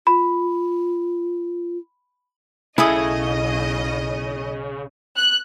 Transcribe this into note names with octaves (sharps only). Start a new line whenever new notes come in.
F4 B5
B1 C#3 E4 G#4 A4 D#5 D#6
F#6